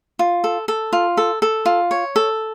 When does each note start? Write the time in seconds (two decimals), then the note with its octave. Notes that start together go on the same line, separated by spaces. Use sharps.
0.19 F4
0.44 A4
0.68 A4
0.93 F4
1.17 A4
1.42 A4
1.66 F4
1.91 C#5
2.16 A4